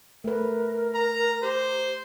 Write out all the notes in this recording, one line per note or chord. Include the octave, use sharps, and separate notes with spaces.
A3 A#4 B4
A#5
G4 C5